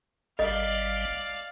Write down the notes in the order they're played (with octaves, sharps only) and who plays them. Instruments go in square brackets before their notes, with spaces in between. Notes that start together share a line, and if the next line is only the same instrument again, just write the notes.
[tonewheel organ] G#1 G3 [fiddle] D5 F5 [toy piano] D#5